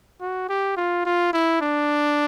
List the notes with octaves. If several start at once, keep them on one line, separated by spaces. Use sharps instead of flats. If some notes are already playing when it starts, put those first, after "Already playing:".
F#4
G4
F4
F4
E4
D4